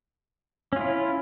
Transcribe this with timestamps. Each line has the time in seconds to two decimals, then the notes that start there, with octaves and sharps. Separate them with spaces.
0.73 C#4
0.76 F4
0.80 E4